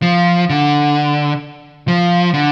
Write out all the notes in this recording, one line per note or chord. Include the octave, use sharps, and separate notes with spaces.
F3
D3
F3
D3